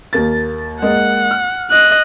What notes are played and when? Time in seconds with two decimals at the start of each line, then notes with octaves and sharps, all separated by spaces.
0.13 D#2 A#3 A6
0.82 G#3 A#3 F#5
1.31 F6
1.71 D#5 F#6